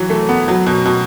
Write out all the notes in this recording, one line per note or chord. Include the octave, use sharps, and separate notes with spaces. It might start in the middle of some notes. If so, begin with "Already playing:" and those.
Already playing: E3 F#3
A3
B3
F#3
B2
B2